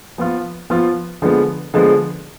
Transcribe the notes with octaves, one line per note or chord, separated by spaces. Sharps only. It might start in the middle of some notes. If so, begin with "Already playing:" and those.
F3 B3 F4
F3 B3 F4
D3 F3 G#3 B3
D3 F3 G#3 B3